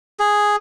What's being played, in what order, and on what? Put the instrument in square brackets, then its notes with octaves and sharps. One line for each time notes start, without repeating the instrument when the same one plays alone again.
[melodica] G#4